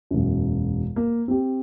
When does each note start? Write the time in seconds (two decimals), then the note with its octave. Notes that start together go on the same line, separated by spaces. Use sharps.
0.11 E1 F#2
0.96 A#3
1.28 C4 G4